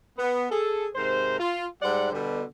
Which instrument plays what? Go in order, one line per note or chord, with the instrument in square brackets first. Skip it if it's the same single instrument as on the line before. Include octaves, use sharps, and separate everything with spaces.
[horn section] B3
G#4 A4
G#2 C3 A#4 C5
F4
G#2 G3 C5 D5 F#5
B2 D3 G3